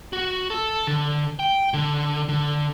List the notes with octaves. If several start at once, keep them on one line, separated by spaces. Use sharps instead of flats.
F#4
A4
D3
G5
D3
D3